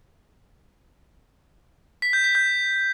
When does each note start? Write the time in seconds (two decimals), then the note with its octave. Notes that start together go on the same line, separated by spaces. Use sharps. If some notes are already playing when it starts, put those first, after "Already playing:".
2.02 B6
2.13 G6
2.24 B6
2.35 G6